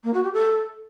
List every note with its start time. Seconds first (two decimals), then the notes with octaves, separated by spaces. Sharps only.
0.04 A#3
0.14 F#4
0.23 G4
0.33 A4